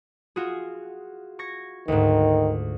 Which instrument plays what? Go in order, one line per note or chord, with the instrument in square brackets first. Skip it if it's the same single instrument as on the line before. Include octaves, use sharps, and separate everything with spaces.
[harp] F4 F#4 G#4
C#6 G#6 A#6
[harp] D2 G#2 [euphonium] D#3